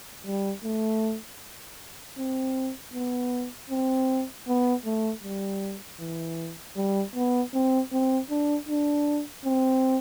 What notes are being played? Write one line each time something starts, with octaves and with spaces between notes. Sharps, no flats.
G3
A3
C4
B3
C4
B3
A3
G3
E3
G3
B3
C4
C4
D4
D4
C4